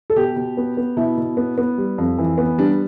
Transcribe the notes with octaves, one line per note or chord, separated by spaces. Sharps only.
A4
B2 G4
B2
B3
B3
B2 E4
B2
B3
B3
G3
F2
E3
B3
G3 D4